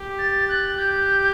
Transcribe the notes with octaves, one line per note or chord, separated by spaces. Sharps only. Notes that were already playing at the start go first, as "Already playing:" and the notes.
Already playing: G4
A6
F#6
G4 G6